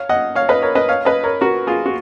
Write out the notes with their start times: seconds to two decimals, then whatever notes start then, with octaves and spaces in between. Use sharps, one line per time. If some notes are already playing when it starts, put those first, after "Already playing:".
Already playing: C#5 F5
0.09 D#5 F#5
0.35 C#5 F5
0.49 B4 D#5
0.62 A#4 C#5
0.75 B4 D#5
0.88 C#5 F5
1.05 B4 D#5
1.23 A#4 C#5
1.41 F#4 A#4
1.67 F4 G#4
1.86 F#4